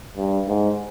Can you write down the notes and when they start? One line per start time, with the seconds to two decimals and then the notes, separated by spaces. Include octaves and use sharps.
0.17 G2
0.48 G#2